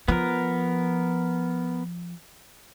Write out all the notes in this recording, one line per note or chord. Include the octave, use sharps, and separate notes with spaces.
F3 B3 A#4